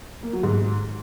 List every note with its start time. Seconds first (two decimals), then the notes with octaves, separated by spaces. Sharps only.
0.23 A#3
0.33 F#3
0.43 G#2